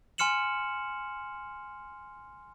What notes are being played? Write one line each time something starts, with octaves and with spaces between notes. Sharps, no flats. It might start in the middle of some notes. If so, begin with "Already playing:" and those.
G#5 C6 F6 C#7 E7 F#7